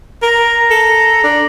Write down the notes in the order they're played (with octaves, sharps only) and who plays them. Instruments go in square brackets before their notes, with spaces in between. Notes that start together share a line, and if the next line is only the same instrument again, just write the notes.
[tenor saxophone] A#4 [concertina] A#5
[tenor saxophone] A4
D4